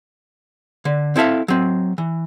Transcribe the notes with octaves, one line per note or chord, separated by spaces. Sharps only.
D3
C4 E4 A4 E5 F5
F#3 C4
E3